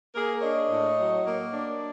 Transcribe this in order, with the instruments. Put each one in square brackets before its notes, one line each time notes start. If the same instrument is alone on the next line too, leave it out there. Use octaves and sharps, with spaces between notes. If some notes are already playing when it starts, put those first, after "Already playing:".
[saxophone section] A#3 G#4 A#4
D4 C#5 D#5
A2
F#3
A#3
D4